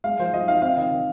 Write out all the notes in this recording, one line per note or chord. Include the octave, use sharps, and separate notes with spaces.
G#3 F5
F3 C5
F3 D#5
D#4 F5
C4 F5
D#3 D#5
D#3